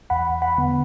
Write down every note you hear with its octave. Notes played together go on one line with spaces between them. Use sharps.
E2 F#5 B5
F#5 B5
D3 B3